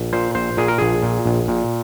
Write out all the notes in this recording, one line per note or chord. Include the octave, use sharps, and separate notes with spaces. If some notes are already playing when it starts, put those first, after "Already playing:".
Already playing: A#1
A#2 C5
A#1 C5
A#2 G#4
A#4
A#1 G#4
A#2
A#1
A#2